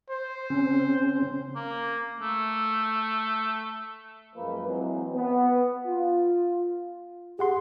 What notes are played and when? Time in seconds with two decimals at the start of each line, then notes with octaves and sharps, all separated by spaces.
0.10 C5
0.50 C#3 C4 C#4
1.56 A#3
2.20 A3
4.36 F#2 F3 G#3 A#3 B4
4.67 E3 F#3 G#3 C4
5.15 B3
5.86 F4
7.39 G4 G#4 F#5 C6